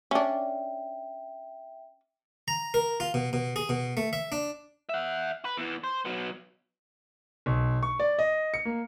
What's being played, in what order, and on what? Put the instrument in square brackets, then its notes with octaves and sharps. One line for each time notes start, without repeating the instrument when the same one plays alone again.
[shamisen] C#4 D4 [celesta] E5 G5
[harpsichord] A#5
A#4
F4
B2
B2
G#4
B2
A3
E5
D4
[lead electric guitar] E5 F#5
B4
E2 E3
C5
F#3 B3
[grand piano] B1
C#6
D5
D#5
C#7
A#3